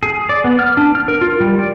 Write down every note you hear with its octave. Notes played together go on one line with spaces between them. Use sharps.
G#4
D5
B3
F6
D4
F6
A#4
F4
G3
D5